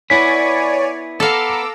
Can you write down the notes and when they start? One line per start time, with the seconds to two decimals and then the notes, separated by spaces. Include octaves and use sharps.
0.10 B3 E4 B4 C#5 D5 G#5 B6
1.20 B3 A4 F5 A#5 D6 E6